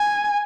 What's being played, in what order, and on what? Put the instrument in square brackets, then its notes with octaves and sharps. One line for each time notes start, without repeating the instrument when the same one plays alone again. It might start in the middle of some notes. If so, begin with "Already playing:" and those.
Already playing: [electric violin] G#5